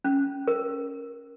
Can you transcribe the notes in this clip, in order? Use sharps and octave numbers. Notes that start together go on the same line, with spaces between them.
C#4
A#4